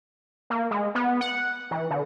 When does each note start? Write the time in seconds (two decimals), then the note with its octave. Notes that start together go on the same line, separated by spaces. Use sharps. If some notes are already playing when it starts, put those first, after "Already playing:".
0.50 A#3
0.71 G#3
0.95 B3
1.21 F#5
1.71 E3
1.90 D3